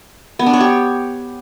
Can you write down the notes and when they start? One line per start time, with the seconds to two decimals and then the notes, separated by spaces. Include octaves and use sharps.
0.39 B3
0.46 D4
0.53 C#5
0.60 G4